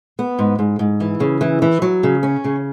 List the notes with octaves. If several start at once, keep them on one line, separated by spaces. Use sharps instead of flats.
B3
G#2
G#2
G#2
E3
C#3
E3
E3
F#3
C#3
C#4
C#3